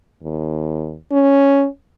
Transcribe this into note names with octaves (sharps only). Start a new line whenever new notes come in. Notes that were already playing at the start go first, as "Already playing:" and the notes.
D#2
C#4